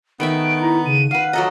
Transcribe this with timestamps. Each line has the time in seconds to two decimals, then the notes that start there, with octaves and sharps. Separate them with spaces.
0.20 D#3 A3 B3 E5 D7
0.61 E4 A#5
0.85 C#3 D#7
1.11 B4 F5 F#5
1.33 F#3 A4 D#5 A#5